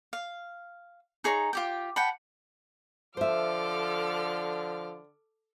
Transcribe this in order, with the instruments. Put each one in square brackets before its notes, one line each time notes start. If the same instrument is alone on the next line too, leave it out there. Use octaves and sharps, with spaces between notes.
[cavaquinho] F5
D#4 G#4 C#5 A#5
F4 G4 G5
F#5 G5 A5 B5
[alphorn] D3 [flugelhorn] F3 [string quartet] A4 D6 F6 [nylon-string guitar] C5 E5